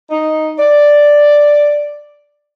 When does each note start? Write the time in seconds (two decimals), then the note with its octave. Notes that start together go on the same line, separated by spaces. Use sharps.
0.10 D#4
0.59 D5